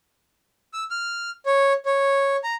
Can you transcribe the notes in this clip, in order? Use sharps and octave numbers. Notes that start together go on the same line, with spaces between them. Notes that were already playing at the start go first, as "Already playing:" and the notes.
E6
F6
C#5
C#5
A#5